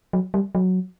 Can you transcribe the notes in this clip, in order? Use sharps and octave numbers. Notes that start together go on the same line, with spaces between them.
F#3
G3
F#3